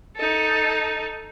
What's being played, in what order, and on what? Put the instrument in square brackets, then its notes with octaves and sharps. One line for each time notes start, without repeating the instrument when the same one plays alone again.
[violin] D#4 A4